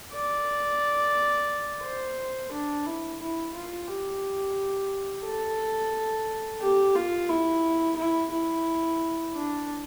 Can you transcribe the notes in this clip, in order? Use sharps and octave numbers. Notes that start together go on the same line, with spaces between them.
D5
C5
D4
E4
E4
F4
G4
A4
G4
F4
E4
E4
E4
D4